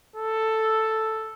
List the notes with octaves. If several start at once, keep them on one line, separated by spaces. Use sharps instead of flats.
A4